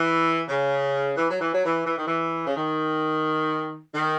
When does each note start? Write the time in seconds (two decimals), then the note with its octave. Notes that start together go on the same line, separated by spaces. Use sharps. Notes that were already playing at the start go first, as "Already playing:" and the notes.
Already playing: E3
0.49 C#3
1.17 E3
1.30 F#3
1.41 E3
1.54 F#3
1.65 E3
1.87 E3
1.98 D#3
2.07 E3
2.47 C#3
2.57 D#3
3.94 D#3